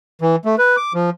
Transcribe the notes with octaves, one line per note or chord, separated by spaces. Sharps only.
E3
A3
B4
D6
F3